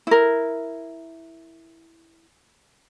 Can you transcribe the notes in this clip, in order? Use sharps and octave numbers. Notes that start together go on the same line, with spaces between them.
E4 A#4